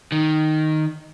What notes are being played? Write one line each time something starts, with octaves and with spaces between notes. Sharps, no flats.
D#3